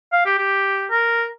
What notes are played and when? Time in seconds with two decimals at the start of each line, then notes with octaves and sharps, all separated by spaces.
0.12 F5
0.26 G4
0.38 G4
0.91 A#4